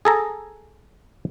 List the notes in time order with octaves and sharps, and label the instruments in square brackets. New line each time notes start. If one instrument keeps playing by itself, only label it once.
[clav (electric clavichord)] G#4 A4 A#5